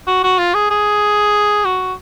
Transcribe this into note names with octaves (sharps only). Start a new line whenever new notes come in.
F#4
F#4
F4
G#4
G#4
F#4